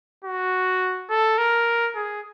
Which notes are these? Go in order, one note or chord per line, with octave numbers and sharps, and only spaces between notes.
F#4
A4
A#4
G#4